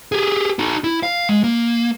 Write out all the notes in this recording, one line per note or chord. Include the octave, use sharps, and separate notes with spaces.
G4 G#4
D#4 F#4
E4
F5
G#3
A#3